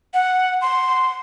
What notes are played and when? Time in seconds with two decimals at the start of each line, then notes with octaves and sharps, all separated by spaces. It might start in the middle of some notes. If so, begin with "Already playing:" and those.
0.14 F#5
0.62 C6